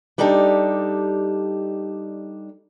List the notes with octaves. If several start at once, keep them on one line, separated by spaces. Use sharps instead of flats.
G3 D4 D#4 G4 A4